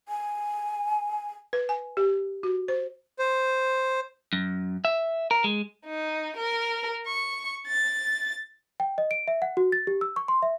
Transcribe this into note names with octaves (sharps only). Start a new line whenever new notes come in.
G#5
B4
G#5
G4
F#4
C5
C5
F#2
E5
A#4
G#3
D#4
A#4
C#6
A6
G5
D#5
D7
E5
F#5
F#4
A6
G4
E6
C#6
C6
E5